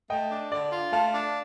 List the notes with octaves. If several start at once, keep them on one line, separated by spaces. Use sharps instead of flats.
A3 D#5 G5
D4
D3 D5
F4
A3 F5 A5
D4